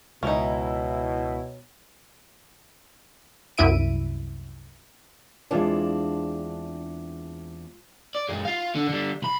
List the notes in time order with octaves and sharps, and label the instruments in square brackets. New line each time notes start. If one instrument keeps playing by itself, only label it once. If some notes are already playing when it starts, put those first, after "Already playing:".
[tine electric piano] C#2 [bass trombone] B2 [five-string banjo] C#4 D#4 [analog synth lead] E4
[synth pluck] C2 F#2 E4 E5 D7 D#7
[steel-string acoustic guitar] E2 C4 D4 [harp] G#3 F4 A5
[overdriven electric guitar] D5
F#2 G#3
F4 F5
D3
D3 G3
C2 B5